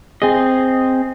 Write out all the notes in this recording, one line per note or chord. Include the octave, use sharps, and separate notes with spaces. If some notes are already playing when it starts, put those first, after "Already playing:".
C4 G#4 D#5